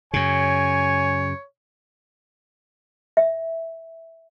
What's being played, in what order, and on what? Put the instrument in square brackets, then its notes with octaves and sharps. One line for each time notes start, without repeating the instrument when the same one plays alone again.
[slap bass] F#2 C#3 [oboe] C#5 [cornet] G#5
[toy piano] E5